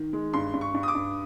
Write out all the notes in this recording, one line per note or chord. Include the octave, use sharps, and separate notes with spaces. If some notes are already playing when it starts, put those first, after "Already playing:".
Already playing: D#3
G#3
G2 C6
G2
C#6
G2
D#6
D6
G2